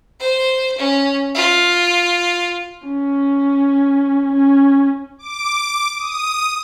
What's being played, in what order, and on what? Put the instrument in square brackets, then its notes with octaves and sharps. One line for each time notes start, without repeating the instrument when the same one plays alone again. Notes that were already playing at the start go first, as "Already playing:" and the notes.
[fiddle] C5
C#4
F4
[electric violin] C#4
C#4
[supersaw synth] D6
D#6